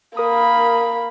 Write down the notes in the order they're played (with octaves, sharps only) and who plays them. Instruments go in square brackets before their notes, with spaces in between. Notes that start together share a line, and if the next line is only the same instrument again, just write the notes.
[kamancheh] A#3 B5 [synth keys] A#4 D#6